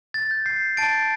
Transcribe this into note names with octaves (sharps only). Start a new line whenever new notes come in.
A6
G6
G6 C7
A5 A6 D7